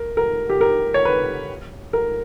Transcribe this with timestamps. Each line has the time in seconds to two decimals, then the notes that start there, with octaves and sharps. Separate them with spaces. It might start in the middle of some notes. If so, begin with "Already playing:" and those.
Already playing: A#4
0.17 A#4
0.50 G4
0.61 A#4
0.94 C#5
1.05 B4
1.93 A#4